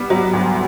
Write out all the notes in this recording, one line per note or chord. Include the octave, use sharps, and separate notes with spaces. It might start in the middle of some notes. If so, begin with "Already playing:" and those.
Already playing: G3 B3
F#3
D2